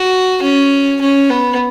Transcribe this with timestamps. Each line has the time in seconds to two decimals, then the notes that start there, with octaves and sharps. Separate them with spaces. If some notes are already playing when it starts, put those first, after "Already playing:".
Already playing: F#4
0.42 C#4
1.01 C#4
1.30 B3